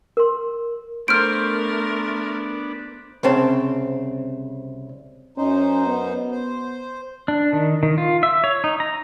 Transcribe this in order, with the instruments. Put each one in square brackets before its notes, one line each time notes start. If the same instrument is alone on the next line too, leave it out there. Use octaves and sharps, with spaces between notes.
[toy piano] A#4 C6
[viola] A3 A#4 [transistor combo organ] B3 D4 [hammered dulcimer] C5 [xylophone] F6 D7
[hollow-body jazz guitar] C2 C#3 C4 A5
[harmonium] F#2 D#4 C5 [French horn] C#4
[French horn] B3
[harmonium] C5
[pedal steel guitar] D4
D#3
D#3
F4
E5
C#5
D#4
A#5